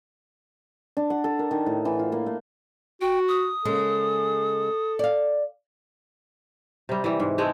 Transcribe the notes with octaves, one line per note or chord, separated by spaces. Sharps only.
D4
F#5
A4
A#4
D#3
A2
E3
F4
A#3
A3
F#4 G5
D#6
C#3 G#3 A#3 A4
D5 F5
C3 G3
E3 G3
G#2
G#3 A3 C4 G#4